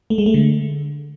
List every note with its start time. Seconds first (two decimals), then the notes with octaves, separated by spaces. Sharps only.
0.10 A3
0.18 G#3
0.26 A3
0.34 D3